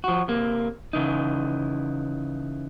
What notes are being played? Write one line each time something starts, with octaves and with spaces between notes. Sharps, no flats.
F3 F#4
C3 A#3
C#3 E3 D#4